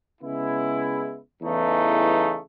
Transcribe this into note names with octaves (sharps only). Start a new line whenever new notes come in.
C#3 G#3 B3 E4
E2 C#3 E3 A3 D#4